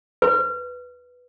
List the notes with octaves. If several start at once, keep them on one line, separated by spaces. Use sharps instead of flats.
B4